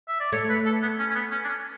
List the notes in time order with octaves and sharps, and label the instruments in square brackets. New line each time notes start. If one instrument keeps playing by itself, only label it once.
[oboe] E5
D5
[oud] A3 [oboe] C#5
[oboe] B4
A4
B3
C#4
C#4
B3
C#4
D4
C#4